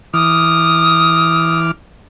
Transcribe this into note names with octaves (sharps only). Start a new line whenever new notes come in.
E3 D6 D#6 F6